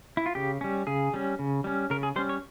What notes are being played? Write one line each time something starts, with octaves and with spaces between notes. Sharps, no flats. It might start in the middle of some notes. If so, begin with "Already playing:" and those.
E4
F4
C#3 G4
G3 C#4
C#3 G#4
G3 C#4
C#3
G3 C#4
C#3 A#4
G#4
G3 C#4 C5
C#5